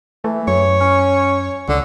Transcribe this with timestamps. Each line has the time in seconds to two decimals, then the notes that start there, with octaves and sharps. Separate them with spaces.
0.24 E3 A3
0.48 F#2 C#5
0.80 C#4
1.68 C#2 D3